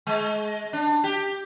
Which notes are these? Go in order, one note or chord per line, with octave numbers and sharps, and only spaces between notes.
G#3
D4
G4